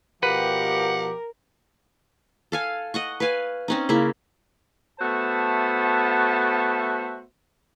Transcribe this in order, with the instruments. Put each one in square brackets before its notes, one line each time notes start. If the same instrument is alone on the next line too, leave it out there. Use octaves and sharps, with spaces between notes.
[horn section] B2 F3 G4 [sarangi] A#4 [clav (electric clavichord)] B4 [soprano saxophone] F#5
[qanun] A4 F5 G#5
D#5 F#5 C#6
B4 C#5 F5 G#5
C4 C#4 D#4
C#3 A#3 E4
[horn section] A3 B3 F#4 C5 E5 A5